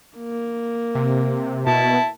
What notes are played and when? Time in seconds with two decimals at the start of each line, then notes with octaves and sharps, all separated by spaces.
0.17 A#3
0.95 C3
1.67 B2 E4 A5